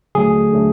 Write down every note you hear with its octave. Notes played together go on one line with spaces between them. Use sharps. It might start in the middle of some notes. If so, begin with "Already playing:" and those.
D3 F#3 A3 G#4
D3 F#3 A3